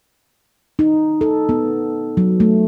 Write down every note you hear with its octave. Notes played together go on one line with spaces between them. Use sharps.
D#4
A4
B3
F#3
A3